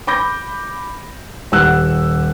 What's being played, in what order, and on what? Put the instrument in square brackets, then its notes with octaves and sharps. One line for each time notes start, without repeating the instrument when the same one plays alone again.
[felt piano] B5 D6 G6 A#6
D#1 G4 F#5 E6 F#6